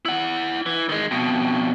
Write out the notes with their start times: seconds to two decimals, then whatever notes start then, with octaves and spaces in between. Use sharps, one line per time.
0.05 E4 F#5
0.66 E3
0.89 D#3 G#3
1.11 F2 B2